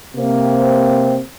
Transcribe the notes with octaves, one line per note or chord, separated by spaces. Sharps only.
C3 A#3 C4